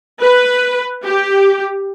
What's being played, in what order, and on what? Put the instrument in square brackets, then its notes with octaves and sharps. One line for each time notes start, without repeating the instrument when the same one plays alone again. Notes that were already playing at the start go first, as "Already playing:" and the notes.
[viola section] B4
G4